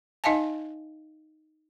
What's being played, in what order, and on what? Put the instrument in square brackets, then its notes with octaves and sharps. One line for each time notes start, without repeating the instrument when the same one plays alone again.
[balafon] D#4 D#5 F5 G#5 A5